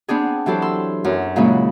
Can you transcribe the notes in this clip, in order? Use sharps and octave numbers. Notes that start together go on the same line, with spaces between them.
B3 C4 D4 G#4
E3 F#3 G4 A4 C5
C6 E6
F#2 A#4
A#2 C#3 E3 F#3 G#3 C#4